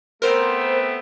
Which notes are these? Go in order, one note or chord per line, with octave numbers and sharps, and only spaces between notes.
A3 B3 C4 A#4 C5